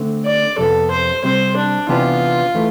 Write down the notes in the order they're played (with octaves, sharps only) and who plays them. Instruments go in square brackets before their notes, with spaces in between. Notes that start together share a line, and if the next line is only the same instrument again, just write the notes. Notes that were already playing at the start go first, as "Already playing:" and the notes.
Already playing: [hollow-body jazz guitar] D3 A3 C4
[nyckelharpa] D5
[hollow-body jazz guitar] F2 C3 F3 B3 [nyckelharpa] A4
[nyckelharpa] C5
[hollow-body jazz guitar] C3 G3 C4 [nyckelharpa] C5
[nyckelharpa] D4
[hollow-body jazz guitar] C3 E3 B3 D4 G4 [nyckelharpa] F4
[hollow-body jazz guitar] E3 A3